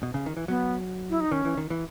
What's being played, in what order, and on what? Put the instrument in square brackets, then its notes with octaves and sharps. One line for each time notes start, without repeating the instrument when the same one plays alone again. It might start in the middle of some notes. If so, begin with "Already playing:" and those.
[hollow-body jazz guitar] B2
C#3
D#3
E3
[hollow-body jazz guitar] F#3 [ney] B3
[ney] E4
D#4
[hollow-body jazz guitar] D#3 [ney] C#4
[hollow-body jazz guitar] E3
D#3
E3